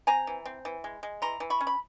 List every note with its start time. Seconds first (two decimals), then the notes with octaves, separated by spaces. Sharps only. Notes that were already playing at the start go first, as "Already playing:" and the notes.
0.07 C4 G#5 A#5
0.27 E3
0.45 C4
0.65 E3
0.84 G#3
1.03 G#3
1.22 E3 A#5 C6
1.40 E3
1.50 B5 C#6
1.60 C#4
1.67 B5